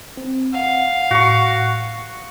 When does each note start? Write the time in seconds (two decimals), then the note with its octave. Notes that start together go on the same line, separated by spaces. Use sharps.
0.17 C4
0.53 F5 F#5
1.11 A2 F#4 C#6